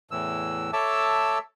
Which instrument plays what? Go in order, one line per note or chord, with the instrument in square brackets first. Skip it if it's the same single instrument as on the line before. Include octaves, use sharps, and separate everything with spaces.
[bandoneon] E2 A2 E3 E6
A4 C#5 E5 A5 D6 E6